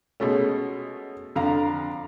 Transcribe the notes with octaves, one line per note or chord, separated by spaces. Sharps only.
B2 G#3 A3 C#4
F2 D3 F5 A#5